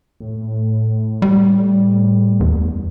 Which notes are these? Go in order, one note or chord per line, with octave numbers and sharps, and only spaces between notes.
A2
G3
E2